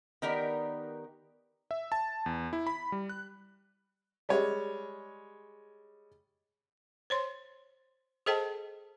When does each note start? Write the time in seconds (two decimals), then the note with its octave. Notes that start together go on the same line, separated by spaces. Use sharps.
0.22 D#3 B3 D#4 G4 A#4 D5
1.71 E5
1.92 A5
2.26 E2
2.53 E4
2.67 B5
2.92 G3
3.09 F#6
4.29 G3 G#3 C#5
7.10 C5 C#5 C6
8.26 G#4 A4 C5 D#5 G5 A5